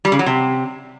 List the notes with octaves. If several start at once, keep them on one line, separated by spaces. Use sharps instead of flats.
G3
C#3
F#3
C3